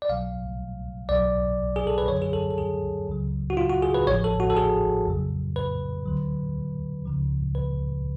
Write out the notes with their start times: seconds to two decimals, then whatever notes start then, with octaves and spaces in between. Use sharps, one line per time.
0.02 D5
0.09 B1 B2 F#3 F5
1.09 B1 B2 F#3 D5
1.76 G#4
1.87 A4
1.98 B4
2.08 F#2 D3 F#3 C#5
2.22 G#4
2.33 A4
2.50 A4
2.58 G#4
3.08 C#2 C#3 F#3
3.50 F#4
3.57 F4
3.69 F#4
3.82 G#4
3.94 B4
4.07 A1 A2 F3 C#5
4.24 A4
4.40 F#4
4.50 A4
4.57 G#4
5.06 F2 C#3 F#3
5.56 B4
6.06 D2 D3 F#3
7.05 C#2 C#3 F3
7.55 B4